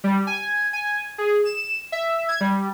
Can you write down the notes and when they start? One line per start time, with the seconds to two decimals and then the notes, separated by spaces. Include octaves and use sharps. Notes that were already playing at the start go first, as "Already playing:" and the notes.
0.04 G3
0.27 G#5
0.73 G#5
1.18 G#4
1.45 E7
1.92 E5
2.29 G#6
2.41 G3